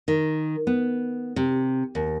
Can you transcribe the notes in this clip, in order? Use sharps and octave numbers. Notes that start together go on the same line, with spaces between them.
D#3
B3
C3
D#2